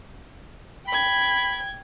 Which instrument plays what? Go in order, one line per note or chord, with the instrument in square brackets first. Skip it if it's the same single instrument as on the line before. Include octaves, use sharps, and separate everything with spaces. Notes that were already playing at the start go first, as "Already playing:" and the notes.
[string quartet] G5 G#6 [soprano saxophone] B5